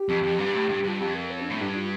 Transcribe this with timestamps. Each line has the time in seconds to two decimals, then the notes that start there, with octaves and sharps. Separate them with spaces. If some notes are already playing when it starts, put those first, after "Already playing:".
Already playing: G4
0.09 F2
0.23 F2
0.39 G2
0.54 A2
0.69 G2
0.84 G2 F4
1.00 F2 G4
1.14 A#4
1.30 C#5
1.40 C#4
1.45 A2 D4
1.60 G2 D4
1.75 F4